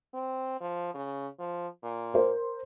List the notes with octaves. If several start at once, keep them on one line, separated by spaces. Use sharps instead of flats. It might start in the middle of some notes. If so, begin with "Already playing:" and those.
C4
F3
C#3
F3
A#2
A#4 C5